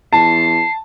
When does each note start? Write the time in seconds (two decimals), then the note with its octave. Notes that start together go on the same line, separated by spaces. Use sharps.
0.13 E2 A5 C7